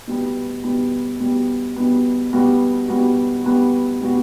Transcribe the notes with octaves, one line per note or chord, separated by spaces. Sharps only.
B2 G3 B3
B2 G3 B3
B2 G3 B3
B2 G3 B3
B2 G3 B3 F#4
B2 G3 B3 F#4
B2 G3 B3 F#4
B2 G3 B3 F#4